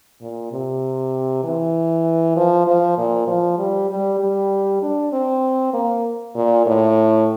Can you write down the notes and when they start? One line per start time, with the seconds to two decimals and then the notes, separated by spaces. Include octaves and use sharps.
0.21 A#2
0.51 C3
1.44 E3
2.36 F3
2.67 F3
2.98 A#2
3.27 F3
3.58 G3
3.89 G3
4.19 G3
4.82 D4
5.12 C4
5.73 A#3
6.35 A#2
6.66 A2